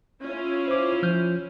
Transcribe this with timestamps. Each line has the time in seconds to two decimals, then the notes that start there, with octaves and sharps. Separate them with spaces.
0.23 C#4 E4 F4
0.68 C5 D6
1.03 F3 F6 G6